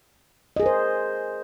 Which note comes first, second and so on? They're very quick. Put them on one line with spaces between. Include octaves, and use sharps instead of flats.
D#5 G#4 A#4 C5